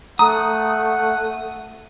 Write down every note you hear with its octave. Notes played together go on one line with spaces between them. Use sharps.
A3 F#5 A#5 D#6